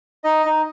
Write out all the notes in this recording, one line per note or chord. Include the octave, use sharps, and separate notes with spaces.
D#4 D#5
D#4